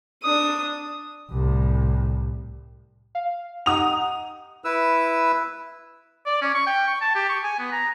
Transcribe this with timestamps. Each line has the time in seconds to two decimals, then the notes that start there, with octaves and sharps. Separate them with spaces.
0.23 D4 D#6
1.31 C2 A2
3.15 F5
3.66 D#4 G4 F#5 D#6 F7
4.65 E4 B4 E6
6.26 D5
6.42 C#4
6.55 C#6
6.67 G5
6.88 C#6
7.01 A5
7.16 G4
7.29 C#6
7.44 G#5
7.59 B3
7.72 A#5